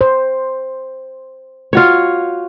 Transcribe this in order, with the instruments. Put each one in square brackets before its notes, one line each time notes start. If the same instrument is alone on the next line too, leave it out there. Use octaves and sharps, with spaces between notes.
[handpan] C5
[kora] F4 F#4 C#5